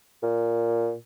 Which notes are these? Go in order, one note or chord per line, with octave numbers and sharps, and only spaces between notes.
A#2